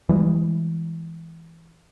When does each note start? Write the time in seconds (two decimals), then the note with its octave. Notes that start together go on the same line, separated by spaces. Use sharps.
0.09 E3 G3 G#3